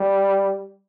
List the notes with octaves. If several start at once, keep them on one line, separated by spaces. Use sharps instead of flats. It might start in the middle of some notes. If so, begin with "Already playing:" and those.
Already playing: G3